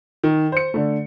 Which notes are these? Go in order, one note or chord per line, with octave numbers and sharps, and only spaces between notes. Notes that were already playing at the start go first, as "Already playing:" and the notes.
D#3
C5 C#7
D3 A3